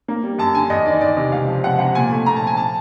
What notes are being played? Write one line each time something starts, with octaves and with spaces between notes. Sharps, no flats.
A#3
G3
F#2 A5
D3 G#5
E2 D#5
D#3 D5
E2 D5
C3
C#2 F5
F3
C#2 F#5
C3 F#5
A#2 G#5
A3
A#2 A#5
A5
F3
G#5
A5